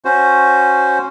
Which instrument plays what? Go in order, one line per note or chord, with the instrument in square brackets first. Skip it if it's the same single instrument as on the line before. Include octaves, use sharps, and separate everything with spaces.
[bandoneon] C#4 F#4 C5